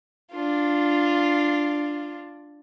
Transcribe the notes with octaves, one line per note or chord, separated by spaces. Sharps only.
D4 F4